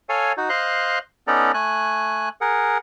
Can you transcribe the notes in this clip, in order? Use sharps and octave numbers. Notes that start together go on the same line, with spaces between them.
A4 C#5 F5 G#5
D#4 F#4
C5 D#5 F5 C6 F#6
B3 C#4 D#4 A4 D5 A#5
A3 G#5 F#6
G#4 A#4 F#5